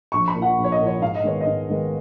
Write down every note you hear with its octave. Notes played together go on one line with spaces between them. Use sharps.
A#1 C#6
B5
A#2
F3 F#5
A#1
C#5
D#5
A#2
F3 C#5
G#2 F5
D#5
D#3 G#3 B3 C#5
D#5
G#2
D#3 G#3 B3